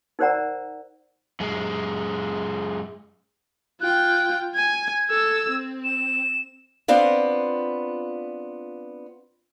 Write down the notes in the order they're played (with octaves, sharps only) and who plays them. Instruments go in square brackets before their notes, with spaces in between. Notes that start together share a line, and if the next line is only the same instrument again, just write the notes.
[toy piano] D#4 A#4 C5 D5 F#5 A#5
[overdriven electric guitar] F#2 G#3
[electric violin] F4 G5 [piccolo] F#6
[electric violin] G#5 [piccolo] G#6
[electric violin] A4 E6
C4
[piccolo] E7
[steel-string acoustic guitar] B3 C4 D4 F4